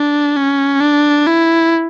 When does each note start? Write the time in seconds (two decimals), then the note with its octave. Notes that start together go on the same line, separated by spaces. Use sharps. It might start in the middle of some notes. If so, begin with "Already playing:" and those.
Already playing: D4
0.36 C#4
0.81 D4
1.27 E4